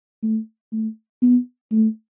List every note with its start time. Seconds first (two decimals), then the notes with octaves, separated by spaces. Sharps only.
0.23 A3
0.73 A3
1.22 B3
1.72 A3